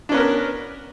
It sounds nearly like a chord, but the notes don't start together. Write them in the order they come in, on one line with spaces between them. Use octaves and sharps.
D4 C#4 B3 A#4 B4